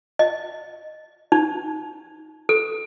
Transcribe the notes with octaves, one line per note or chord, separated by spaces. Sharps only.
D#5
D#4
A4